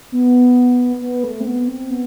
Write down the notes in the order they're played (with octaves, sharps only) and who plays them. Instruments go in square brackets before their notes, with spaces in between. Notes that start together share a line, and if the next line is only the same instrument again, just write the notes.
[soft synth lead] B3
B3
A3
C4
B3
C4
B3